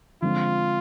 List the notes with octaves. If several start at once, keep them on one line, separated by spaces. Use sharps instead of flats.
D3 F3 G#3 C4 F4